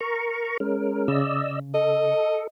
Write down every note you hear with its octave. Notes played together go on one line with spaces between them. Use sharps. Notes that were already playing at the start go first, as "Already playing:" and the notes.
A#4 A#5 C#6
G#3 C#4 A#4
C#3 D5 D#5 E6
A4 D#5